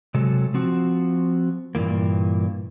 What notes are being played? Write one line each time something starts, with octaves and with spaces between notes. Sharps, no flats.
C3 F#3 G#3 A4
F3 C4 F#4
G2 A#2 E3 A#3